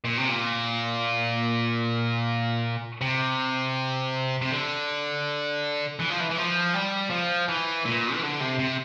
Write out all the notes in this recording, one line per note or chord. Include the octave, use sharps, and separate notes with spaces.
A#2
C3
A#2
C3
C3
D3
E3
F3
E3
E3
F3
G3
F3
E3
A#2
E3
D3
C3
C3